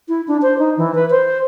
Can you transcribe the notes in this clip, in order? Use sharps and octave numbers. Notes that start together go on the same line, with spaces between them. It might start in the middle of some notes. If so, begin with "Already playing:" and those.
E4
D4
C5
D#4
E3
B4
C5